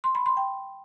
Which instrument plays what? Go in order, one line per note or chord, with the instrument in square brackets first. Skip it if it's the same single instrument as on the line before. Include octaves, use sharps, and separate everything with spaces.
[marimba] C6
B5
C6
G5